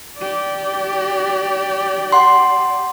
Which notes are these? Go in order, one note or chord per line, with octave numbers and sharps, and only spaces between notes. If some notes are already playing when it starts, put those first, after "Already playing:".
G4 D5
F#5 C6